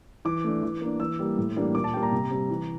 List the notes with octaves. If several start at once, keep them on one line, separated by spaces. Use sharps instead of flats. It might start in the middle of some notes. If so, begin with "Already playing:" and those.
E3 D6
A3 D4
E3
A#3 D4
E3 E6
G3 A#3
A2
E3 G3 A#3 D4
A#2 D6
A5
G3 A#3 G5
A#5
C3
G3 C4
E3